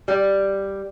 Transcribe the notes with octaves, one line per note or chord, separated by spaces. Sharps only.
G3